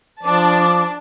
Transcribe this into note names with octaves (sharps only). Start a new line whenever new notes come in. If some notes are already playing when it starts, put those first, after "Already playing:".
F3 D4 A5 D6